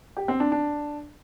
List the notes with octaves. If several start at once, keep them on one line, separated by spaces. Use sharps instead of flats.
G4
C4
D4
D4